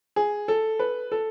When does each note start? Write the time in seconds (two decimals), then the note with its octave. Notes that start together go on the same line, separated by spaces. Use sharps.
0.16 G#4
0.48 A4
0.79 B4
1.12 A4